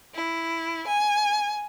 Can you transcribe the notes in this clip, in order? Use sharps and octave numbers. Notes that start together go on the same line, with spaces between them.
E4
G#5